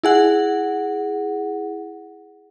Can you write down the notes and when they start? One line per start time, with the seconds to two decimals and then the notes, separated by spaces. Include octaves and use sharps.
0.03 E4 G#4 F#5